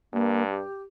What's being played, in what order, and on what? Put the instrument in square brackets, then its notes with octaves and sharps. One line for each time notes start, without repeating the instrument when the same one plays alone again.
[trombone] G2 [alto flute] A#3
[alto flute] G4